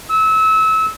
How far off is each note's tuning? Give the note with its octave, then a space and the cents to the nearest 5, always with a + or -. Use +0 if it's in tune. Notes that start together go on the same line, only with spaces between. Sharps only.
E6 -25